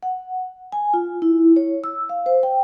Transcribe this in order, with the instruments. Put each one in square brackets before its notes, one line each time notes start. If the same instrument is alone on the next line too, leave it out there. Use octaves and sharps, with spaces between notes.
[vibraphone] F#5
G#5
F4
E4
C#5
E6
F5
C5
G5